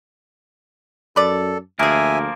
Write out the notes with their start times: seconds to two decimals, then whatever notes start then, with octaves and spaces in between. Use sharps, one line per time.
1.16 F#2 A4 B4 D5
1.79 D2 B2 F3 A#3 G#4 A#4 E5 G#5